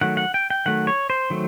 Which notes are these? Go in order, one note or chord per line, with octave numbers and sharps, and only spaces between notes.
D#3 F#3 A3 F#5
F#5
G5
G5
D#3 F#3 A3 F#5
C#5
C5
D#3 F#3 A3